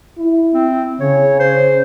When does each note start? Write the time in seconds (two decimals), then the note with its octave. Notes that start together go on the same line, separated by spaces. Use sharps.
0.18 E4
0.54 C4
1.00 C#3 C#5
1.40 C5